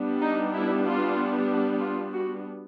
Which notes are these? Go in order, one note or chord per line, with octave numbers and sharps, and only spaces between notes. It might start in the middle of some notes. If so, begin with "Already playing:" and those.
Already playing: G3 B3 D4
D#4
E4
F4
F4
F#4